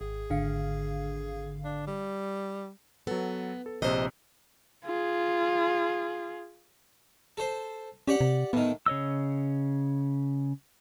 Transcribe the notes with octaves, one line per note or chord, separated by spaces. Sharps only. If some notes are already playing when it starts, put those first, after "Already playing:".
G#1 G#4
G#1 D3 F5
D4
G3
F#3 B3 A4
A4
A#1 C3 G4 C5 D#5
F4 G#4
A4 C5
C#4 G4 D5 F#5
C3
A2 D#3 B3
C#3 C#5 D#5 E6